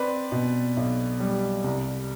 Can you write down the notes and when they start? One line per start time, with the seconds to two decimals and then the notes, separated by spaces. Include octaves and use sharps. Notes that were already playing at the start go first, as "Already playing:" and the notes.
Already playing: C4 B4 D5
0.32 B2
0.77 B1
1.20 G3
1.64 C2